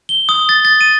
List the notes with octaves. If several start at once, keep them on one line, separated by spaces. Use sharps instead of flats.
G7
D#6
A6
A6
D#7